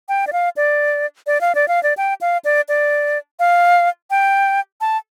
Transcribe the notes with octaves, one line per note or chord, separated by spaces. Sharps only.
G5
D5
F5
D5
D5
F5
D5
F5
D5
G5
F5
D5
D5
F5
G5
A5